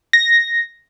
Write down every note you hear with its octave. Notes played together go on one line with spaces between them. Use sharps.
A#6